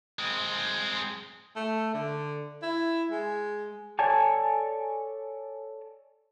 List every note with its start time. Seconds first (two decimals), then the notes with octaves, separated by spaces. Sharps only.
0.19 G#3 C4
1.56 A3
1.94 D3
2.62 E4
3.11 G#3
3.99 A4 C#5 D5 G#5 A5